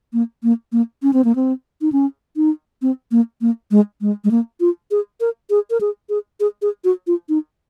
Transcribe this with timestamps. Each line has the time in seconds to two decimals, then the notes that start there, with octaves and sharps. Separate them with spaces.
0.13 A#3
0.43 A#3
0.72 A#3
1.03 C#4
1.13 C4
1.24 A#3
1.35 C4
1.81 D#4
1.92 C#4
2.36 D#4
2.82 C4
3.11 A#3
3.41 A#3
3.71 G#3
4.01 G#3
4.24 G#3
4.31 A#3
4.60 F4
4.91 G#4
5.21 A#4
5.50 G#4
5.70 A#4
5.81 G#4
6.09 G#4
6.40 G#4
6.62 G#4
6.84 F#4
7.07 F4
7.29 D#4